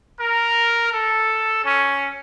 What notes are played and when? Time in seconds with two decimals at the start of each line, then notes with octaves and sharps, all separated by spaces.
0.19 A#4
0.92 A4
1.64 C#4